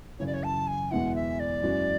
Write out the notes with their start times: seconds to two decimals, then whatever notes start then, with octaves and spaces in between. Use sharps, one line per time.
0.19 F#2 C#3 E3 C#5
0.26 D5
0.33 C#5
0.43 A5
0.67 G#5
0.91 E2 B2 G#3 B3 E4 F#5
1.15 E5
1.39 D5
1.62 F#2 E3 G#3 C#4 F#4